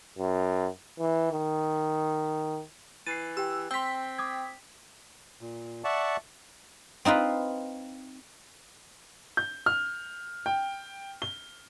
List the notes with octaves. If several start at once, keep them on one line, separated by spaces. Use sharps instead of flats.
F#2
E3
D#3
E3 A6 C7 D#7
G4 G5 E6
C4 G5 C6 E6 B6
D6 D#6 G#6
A#2
D5 E5 F#5 A5 C#6
C4 D#4 F4 B4
G6
F6
G5
G7